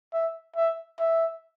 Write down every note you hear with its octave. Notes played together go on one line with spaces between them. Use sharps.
E5
E5
E5